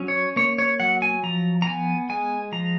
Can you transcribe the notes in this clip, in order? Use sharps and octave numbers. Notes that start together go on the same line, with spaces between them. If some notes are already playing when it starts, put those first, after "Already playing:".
Already playing: F#3 C#4
C#5
A#3 C#5
C#5
F#3 F#5
G#5
F3 A#5
A#5
B3 G#5
G#3 G#5
F3 A#5